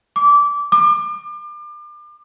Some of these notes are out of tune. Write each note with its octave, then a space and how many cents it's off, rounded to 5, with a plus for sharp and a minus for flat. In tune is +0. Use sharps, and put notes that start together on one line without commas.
D6 -20
D6 +35